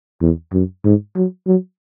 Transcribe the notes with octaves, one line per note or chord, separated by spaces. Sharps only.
E2
F#2
G#2
F#3
F#3